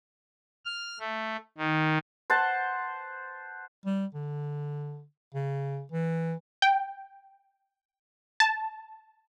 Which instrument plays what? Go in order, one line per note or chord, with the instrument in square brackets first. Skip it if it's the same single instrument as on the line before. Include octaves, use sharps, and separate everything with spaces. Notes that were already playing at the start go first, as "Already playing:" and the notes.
[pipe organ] F6
A3
D#3
[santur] C5 F#5 A5
[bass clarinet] G3
D3
C#3
E3
[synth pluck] G5
A5